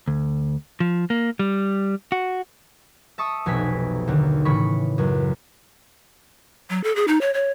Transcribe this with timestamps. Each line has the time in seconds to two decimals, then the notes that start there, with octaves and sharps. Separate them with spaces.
0.08 D2
0.80 F3
1.10 A#3
1.39 G3
2.12 F#4
3.18 E5 A5 C#6 D#6 E6
3.46 F1 B1 G#5 G#6 B6
4.07 D#2 D3
4.45 A2 C#3 E3 B5 C#6
4.98 C#2 F#2
6.70 F#3
6.84 A4
6.96 G#4
7.08 D#4
7.21 C#5
7.34 C#5